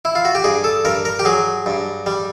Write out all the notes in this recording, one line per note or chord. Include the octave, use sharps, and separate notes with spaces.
E4
F4
F#4
G4
G2 G#4
A4
G2 A#4
A#4
G4
F#3 G#4
G2
G3